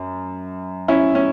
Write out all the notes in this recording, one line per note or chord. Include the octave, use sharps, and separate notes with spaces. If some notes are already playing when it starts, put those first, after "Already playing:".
Already playing: F#2
C#4 E4
C#4